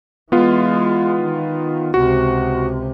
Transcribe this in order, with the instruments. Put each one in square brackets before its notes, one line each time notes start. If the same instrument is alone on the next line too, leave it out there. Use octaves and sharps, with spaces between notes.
[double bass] E3 G#3 [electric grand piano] B3 F4
[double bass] D#3
[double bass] C#2 C3 [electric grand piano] F#4